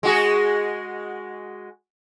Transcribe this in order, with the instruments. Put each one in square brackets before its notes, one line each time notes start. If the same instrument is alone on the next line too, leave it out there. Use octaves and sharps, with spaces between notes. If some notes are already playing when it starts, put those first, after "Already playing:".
[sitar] G#3 F#4 G#4